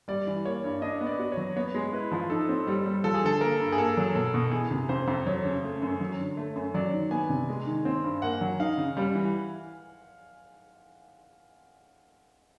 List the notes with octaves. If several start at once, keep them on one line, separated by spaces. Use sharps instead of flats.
G3 D5
E3
A#3 C#5
G2
D4 D#5
B3
D5
F#4
C#5
F#3
B3 C#5
G#3
E4 B4
F3
D#4 A4
C4
G3
G3
F3 A4
G#4
D3 A4
A#3 A#4
G2
G#4
A#3 A4
F#3
B2 A4
B2
E3 G#4
C3
F2 C5
F2
F#3 C#5
C#3
A3
F#2
F#3
D3
A3
F#2
F#3 D5
D#3
B3 G#5
C3
G#3
D#3
C4
G2
A#3 F#5
F#3
D#4 F5
C#3
G3
E3